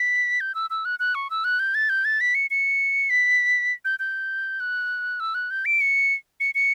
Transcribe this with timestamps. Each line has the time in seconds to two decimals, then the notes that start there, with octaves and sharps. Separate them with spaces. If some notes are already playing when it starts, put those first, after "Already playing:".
Already playing: B6
0.41 G6
0.55 E6
0.70 E6
0.85 F#6
0.99 F#6
1.15 C#6
1.30 E6
1.44 F#6
1.59 G6
1.75 A6
1.89 G6
2.05 A6
2.21 B6
2.35 C#7
2.51 C#7
3.10 B6
3.85 G6
3.99 G6
4.60 F#6
5.20 E6
5.35 F#6
5.51 G6
5.65 D7
5.81 C#7
6.40 C#7
6.55 C#7